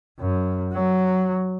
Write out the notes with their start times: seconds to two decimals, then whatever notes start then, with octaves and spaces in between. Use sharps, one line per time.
0.19 F#2
0.73 F#3